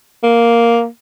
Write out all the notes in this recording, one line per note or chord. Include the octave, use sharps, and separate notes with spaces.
A#3